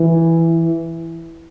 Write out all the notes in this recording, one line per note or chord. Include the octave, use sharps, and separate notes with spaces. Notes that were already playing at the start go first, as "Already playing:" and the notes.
Already playing: E3